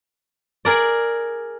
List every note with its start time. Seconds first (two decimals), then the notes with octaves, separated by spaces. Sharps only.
0.65 G#4 A#4 D5